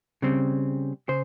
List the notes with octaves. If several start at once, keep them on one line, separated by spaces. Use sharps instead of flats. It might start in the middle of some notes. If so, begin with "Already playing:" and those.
C#3 G3 C4
C#3 C5